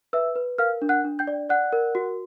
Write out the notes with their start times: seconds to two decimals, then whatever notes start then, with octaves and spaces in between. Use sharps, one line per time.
0.13 B4 E5 E6
0.36 B4
0.58 A#4 F5 F6
0.82 D4
0.89 F#5 F#6
1.04 D4
1.19 G5 G6
1.27 D5
1.49 D5 F#5 F#6
1.73 A#4
1.95 F#4